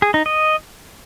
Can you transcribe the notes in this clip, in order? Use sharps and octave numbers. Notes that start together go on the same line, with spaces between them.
G#4
D#4
D#5